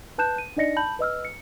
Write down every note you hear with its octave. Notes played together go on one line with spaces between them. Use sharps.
B4 A5 F#6 G6 E7
D#7
D4 D#4 D5 D#5 A#6 C#7
A5 B5 G6 F#7
B4 D#5 E6 F6
C#7